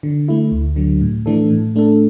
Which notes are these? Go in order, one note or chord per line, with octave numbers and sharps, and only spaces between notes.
D3
A3 E4
D2
D3 F#3
A2
E3 A3 D4 A4
A2
A3 D4 A4